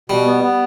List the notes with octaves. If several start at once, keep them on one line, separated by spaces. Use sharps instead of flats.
B2 G3
B3
B3